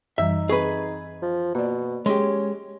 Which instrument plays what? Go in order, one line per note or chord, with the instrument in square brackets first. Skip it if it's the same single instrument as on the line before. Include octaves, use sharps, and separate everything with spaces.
[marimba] F#2 E3 G3 [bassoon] D#4 [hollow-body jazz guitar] E5
[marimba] C4 C#6 [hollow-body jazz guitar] G#4 B4
[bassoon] F3
[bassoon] B2 [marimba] A#3 D5
[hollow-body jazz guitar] G#3 G4 [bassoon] C#4